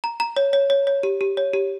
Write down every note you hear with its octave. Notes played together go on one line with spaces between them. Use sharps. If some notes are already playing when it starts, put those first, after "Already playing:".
A#5
A#5
C#5
C#5
C#5
C#5
G4
G4
C#5
G4